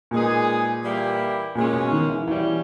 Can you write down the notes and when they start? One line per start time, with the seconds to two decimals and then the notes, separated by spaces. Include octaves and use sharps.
0.11 A#2 G#3 D#4 G#4 B4
0.83 E3 G3 A#3 E4 G4
1.55 A#2 C#3 G#3 C#4
1.73 B2
1.91 D#3
2.10 E3
2.27 B2 E3 G3 C#4